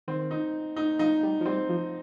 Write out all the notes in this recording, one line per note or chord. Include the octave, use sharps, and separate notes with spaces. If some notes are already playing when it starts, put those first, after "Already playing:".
D#3 C4
D#4
D#4
F3 D#4
G3
F3
G3 C4
F3